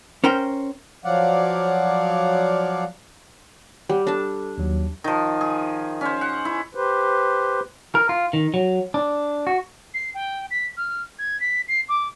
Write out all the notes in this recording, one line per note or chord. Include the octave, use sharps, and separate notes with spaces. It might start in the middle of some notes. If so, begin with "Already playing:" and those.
C#4 A#4 C5 G5
F3 F#3 D5 F5 F#5
G3 F#5 G5
D4 A4 A5
D#2 F#3
D#3 F3
G#4
C#4 C5
F#5
E4
G4 B4 C5
A#4
F4
D#3
F#3
D4
F#4
C7
G5
B6
F6
G#6
B6
C7
D6